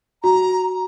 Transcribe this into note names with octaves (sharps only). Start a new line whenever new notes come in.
F#4 A#5